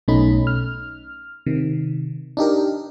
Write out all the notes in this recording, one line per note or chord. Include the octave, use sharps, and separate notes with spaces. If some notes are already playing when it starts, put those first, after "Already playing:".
B1 B2 A3 C#4 D#4 B5
F6
C3 D#3
D4 D#4 G4 A#4